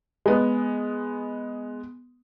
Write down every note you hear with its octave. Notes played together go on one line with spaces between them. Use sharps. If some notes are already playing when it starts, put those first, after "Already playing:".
G#3 B3